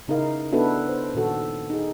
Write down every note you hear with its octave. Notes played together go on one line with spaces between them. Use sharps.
C#3 D#4 E4 A#4 F5
B3 D4 E4 F#4 A4 B4
C5
A#2 D#3 F#4 A4
D#4 G#4